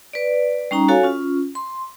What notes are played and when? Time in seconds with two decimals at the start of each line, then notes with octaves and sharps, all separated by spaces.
0.13 B4 D5
0.71 G3 C#4 D#4 A#5
0.88 F#4 A4 C#5 F5 G#5
1.03 C#4 F4
1.55 C6